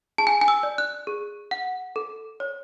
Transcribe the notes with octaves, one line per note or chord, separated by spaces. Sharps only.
G#4 A5
G#5
G#5
E6
D5
F#6
G#4
F#5
A4
C#5